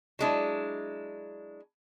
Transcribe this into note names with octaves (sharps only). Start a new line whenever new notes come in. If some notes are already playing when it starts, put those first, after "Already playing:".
F#3 G#3 D4 E4